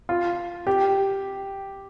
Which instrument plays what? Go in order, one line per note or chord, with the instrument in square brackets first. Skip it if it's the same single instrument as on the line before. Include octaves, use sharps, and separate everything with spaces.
[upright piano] F4
G4